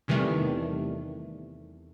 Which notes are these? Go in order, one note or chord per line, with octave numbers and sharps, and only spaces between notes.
E2 C3 D#3 E3 G3 A3